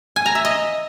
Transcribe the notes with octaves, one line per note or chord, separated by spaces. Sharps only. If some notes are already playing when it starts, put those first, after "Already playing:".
G#5
A#5
E5
D#5